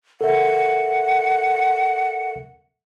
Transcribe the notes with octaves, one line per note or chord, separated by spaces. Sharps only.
A4 A#4 E5 F#5